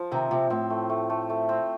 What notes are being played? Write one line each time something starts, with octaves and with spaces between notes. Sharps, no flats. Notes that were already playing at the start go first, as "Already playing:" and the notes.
Already playing: F3
C3 D#3 C4
C3 F3
A2 C4
A3
A3
A3
A3
C4